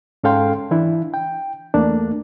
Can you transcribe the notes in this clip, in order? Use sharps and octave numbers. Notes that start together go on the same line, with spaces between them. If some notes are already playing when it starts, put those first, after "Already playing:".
G#2 C#4 A4 F5 G5 C6
E3 D4 E4
G5
E2 A3 A#3 D4